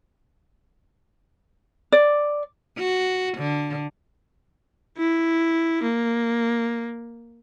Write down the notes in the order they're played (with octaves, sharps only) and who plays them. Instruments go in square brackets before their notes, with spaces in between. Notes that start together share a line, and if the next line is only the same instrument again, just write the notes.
[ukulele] D5
[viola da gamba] F#4
D3
[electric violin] E4
A#3